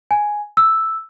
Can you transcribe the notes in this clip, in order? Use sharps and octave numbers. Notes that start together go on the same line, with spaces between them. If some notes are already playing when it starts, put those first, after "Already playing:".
G#5
E6